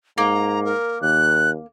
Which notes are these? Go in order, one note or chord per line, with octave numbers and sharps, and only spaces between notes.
G#2 A#3 A#5
A#4
D#2 F#6